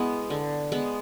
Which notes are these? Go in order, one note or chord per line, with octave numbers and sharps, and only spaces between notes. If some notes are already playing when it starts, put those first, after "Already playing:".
Already playing: G#3 B3 E4
D3
G#3 B3